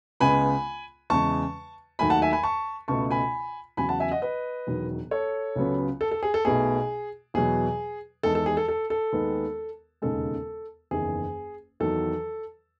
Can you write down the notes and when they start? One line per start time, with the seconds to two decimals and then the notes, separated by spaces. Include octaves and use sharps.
0.20 C#2 C#3 G#3 B3 G#5 B5
1.10 E2 C#3 G#3 A5 C#6
1.99 D#2 D#3 F#3 A3 G#5 B5
2.10 F#5 A5
2.22 E5 G#5
2.32 G#5 B5
2.43 A5 C#6
2.88 C#2 B2 A3 A5 C#6
3.11 G#5 B5
3.77 E2 C#3 F#3 G#5 B5
3.89 F#5 A5
4.00 E5 G#5
4.11 D#5 F#5
4.22 B4 D#5
4.67 E1 E2 D#3 F#3
5.11 A4 C#5
5.56 C#2 C#3 F#3 B3
6.01 A4
6.11 A4
6.23 G#4
6.34 A4
6.45 B1 B2 A3 G#4
7.34 E2 B2 F#3 G#4
8.23 E2 D#3 G#3 A4
8.35 A4
8.46 G#4
8.57 A4
8.68 A4
8.90 A4
9.13 D#2 D#3 G#3 B3
10.02 E1 D#2 C#3 G#3 A4
10.91 F#1 E2 D#3 G#4
11.80 E2 D#3 F#3 A4